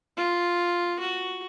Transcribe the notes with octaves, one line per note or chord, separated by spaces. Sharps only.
F4
F#4